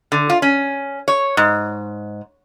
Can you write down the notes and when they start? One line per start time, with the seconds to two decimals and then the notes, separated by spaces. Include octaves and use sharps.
0.12 D3
0.30 F4
0.42 C#4
1.08 C#5
1.37 G#2